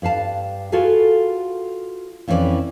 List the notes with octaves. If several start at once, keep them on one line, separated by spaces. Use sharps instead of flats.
G2 B4 F5 A5
F4 F#4 G#4 A4 B4 F5
F2 E3 C#4 D#4 B4 D5